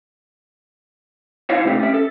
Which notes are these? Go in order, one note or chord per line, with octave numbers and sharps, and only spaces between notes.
D#4 E4 C5 C#5 F5
C3 A3 C4 G4 A4
C#4 E5
A4